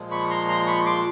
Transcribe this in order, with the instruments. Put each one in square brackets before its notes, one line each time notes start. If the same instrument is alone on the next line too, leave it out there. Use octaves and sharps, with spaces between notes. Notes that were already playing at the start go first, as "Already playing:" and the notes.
Already playing: [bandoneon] A#2 F3 G#3
B5 C#6
A#5 C6
A#5 C6
B5 C#6
C6 D6